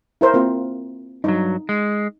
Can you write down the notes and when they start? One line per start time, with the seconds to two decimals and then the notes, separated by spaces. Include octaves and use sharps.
0.21 E4 A#4 C5
0.34 A#3 C4 F4
1.24 G2 F#3 D#4
1.69 G#3